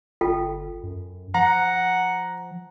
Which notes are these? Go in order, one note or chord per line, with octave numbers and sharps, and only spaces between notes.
G1 F4 A4 G5
F#2
F3 F#5 A#5